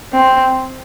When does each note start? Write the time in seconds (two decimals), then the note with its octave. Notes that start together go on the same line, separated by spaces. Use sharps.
0.13 C4